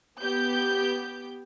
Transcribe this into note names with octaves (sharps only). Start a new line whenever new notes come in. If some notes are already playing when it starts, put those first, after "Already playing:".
B3 G4 G6